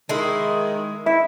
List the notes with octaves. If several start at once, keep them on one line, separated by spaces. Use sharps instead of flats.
D#3 G#3 E4
E4 E5